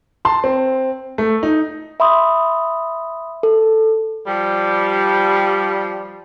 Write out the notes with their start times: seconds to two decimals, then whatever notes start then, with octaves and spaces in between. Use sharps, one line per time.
0.25 A5 C6
0.44 C4
1.18 A3
1.43 D#4
2.00 E5 B5 C6 D#6
3.43 A4
4.27 F3 G3